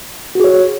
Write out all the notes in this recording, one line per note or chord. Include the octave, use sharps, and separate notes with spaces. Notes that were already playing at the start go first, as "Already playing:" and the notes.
F#4 G#4 C#5